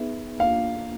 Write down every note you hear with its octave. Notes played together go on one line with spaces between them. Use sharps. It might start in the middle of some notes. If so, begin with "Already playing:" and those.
Already playing: B3 D#4 G#4 B4 E5
A#3 D4 F4 F5